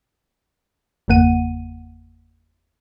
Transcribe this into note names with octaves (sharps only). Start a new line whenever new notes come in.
G1 E2 C#3 A#3 F#5 D#7